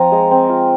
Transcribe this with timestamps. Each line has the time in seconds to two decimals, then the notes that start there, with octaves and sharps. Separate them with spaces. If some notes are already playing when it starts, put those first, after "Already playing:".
Already playing: F3 C4 F4 A#5
0.12 G#3
0.31 C4
0.49 F4